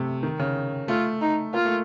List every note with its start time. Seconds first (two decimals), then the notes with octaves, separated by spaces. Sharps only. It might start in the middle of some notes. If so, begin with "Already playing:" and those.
Already playing: C3 A3
0.23 D#3
0.40 C#3
0.88 A3 F4
1.21 D#4
1.54 A#3 F4
1.65 A3